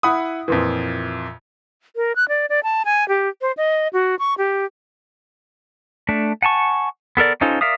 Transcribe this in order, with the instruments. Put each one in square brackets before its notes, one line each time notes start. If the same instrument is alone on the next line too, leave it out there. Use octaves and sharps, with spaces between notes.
[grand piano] E4 F#5 B5 D#6
F2 A#2 E3
[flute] A#4
F#6
D5
D5
A5
G#5
G4
C5
D#5
F#4
C#6
G4
[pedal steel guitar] A3 D4
F#5 G#5 A5 C#6
B3 A4 A#4 D5
C#4 D#4 F4 A4 C5
A#4 D5 E5 F5 D#6